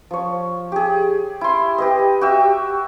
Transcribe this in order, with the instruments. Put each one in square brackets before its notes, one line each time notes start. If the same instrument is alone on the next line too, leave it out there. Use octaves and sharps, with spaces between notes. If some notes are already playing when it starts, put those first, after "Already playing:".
[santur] F3 C#5
G4 G#4
E4 C6
G4 B4 D#5
F#4 G4 E5